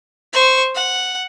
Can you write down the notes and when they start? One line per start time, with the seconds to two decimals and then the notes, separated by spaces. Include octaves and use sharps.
0.33 C5 C#6
0.75 F#5